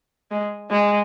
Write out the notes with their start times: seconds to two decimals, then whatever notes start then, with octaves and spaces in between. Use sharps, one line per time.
0.31 G#3
0.71 G#3